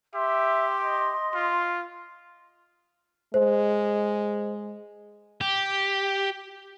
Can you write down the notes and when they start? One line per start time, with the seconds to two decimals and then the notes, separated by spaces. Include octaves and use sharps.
0.15 G4 E5 C6
0.83 D#5
1.35 F4
3.34 G#3 C5
5.41 G4